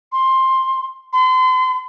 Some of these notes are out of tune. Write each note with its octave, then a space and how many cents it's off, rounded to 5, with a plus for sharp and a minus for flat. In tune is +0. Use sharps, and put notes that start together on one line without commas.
C6 +15
C6 -35